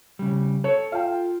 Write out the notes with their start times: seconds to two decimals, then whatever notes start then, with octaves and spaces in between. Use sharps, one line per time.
0.19 C#3 G3
0.64 A4 C#5
0.92 F4 F5 G5